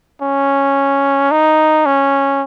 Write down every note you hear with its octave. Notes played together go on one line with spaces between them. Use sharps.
C#4
D#4
C#4